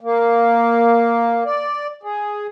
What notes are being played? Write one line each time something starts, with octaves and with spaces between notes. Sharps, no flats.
A#3
D5
G#4